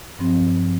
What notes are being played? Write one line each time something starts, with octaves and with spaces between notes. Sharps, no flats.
G2 F3 C4